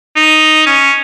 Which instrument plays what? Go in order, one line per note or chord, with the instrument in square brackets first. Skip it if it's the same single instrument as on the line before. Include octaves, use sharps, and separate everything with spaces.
[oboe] D#4
C#4